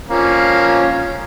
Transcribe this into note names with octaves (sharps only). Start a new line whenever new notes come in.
F3 A#3 C#4